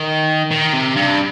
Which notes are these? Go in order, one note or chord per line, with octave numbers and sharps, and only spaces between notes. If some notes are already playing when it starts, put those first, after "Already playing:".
Already playing: D#3
D#3
C3
G2